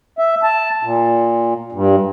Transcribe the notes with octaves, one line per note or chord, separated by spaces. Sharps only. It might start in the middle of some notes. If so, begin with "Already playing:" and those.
E5
A5
A#2
G2